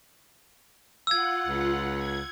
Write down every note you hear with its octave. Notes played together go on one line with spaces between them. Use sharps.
F4 F#5 E6 G#6
C#2
G#6